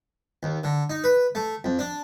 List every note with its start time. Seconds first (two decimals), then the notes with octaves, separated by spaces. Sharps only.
0.43 D#2
0.64 D3
0.90 D#4
1.04 B4
1.35 A3
1.64 F2
1.79 D4